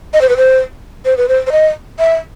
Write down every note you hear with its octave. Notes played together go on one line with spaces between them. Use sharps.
D#5
C5
B4
C5
C5
B4
C5
C5
D#5
E5